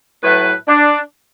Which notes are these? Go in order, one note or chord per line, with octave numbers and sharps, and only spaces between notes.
A2 F#3 A3 B4
D4